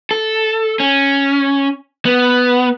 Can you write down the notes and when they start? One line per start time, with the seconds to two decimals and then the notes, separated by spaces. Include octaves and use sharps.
0.11 A4
0.80 C#4
2.05 B3